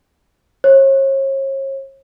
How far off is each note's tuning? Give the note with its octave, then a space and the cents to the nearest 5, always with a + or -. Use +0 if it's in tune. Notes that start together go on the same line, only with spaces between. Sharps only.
C#5 -40